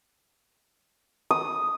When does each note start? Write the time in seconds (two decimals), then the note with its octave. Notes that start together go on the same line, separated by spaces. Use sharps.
1.31 D#6